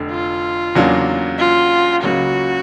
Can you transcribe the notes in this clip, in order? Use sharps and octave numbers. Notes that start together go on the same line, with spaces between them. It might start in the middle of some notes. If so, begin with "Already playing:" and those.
Already playing: F1 F2 D3
F4
E2 C#3 F#3 A#3 D4
F4
C#2 C#3 F#3 A#3 F#4